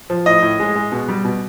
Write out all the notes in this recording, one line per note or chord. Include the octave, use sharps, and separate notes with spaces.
F3
A2 D#5
A2
G#3
G#3
B2
G3
B2